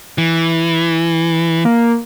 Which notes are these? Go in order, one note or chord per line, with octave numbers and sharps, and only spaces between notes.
E3
A#3